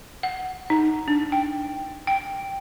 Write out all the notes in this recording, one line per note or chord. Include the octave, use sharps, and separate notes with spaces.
F#5
D#4
D4
G5
G5